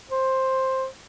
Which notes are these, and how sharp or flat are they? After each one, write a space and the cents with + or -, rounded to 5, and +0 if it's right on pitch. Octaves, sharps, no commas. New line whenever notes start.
C5 +10